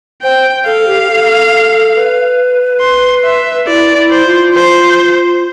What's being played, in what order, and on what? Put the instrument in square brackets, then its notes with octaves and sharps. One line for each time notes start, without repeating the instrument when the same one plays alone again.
[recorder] C5 [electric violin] G5
[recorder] A4 [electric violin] F5
[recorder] G4
A4
B4
[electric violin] C6
E5
[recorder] E4 [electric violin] D5
[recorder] E4
[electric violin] C5
[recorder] F4
[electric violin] C5